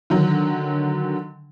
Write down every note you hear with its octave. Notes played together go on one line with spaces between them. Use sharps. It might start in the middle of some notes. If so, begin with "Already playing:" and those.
D3 D#3 F#3